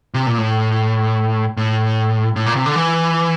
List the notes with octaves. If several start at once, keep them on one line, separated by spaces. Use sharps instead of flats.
C3
A#2
A2
A2
A2
A#2
C3
D3
E3